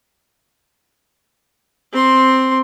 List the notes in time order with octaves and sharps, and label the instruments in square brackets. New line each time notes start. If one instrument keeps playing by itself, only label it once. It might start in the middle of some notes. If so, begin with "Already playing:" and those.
[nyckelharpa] C4 C6